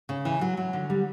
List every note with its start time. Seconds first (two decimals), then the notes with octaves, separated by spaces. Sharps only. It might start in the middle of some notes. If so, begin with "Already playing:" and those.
0.09 C#3
0.25 E3
0.41 F#3
0.57 F#3
0.73 D3
0.90 G3